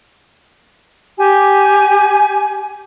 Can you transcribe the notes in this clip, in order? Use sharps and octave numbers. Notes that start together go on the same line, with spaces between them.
G4 G#5